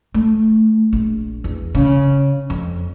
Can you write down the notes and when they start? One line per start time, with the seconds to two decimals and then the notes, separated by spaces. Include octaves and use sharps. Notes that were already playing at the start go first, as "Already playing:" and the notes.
0.14 A3
0.93 A#1
1.44 E2
1.75 C#3
2.50 F2